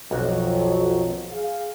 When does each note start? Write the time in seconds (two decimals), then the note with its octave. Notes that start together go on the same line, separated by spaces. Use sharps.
0.11 B1 F2 F3 F#3 F#4 D#5
1.32 G#4 F5